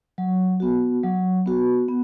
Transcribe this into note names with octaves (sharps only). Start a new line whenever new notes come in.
F#3
B3 F#4
F#3
B3 F#4
B3